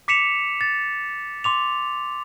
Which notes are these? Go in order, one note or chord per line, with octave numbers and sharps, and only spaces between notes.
D6 B6 C#7 E7 F7
A6
C6 D6 F7